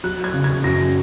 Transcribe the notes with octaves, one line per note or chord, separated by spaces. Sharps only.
F#3 F#6
G#6
C#3
G#6
F#2 A#6